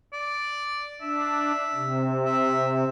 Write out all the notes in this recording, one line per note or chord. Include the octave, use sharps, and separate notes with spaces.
D5
D4 E5
C3
E5